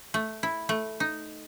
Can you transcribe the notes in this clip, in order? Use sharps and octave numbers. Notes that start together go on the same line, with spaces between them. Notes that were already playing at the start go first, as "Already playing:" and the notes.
A3
E4
A3
D#4